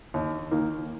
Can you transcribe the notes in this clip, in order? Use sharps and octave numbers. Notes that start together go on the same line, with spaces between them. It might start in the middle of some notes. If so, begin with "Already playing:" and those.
D#2
D#3 A#3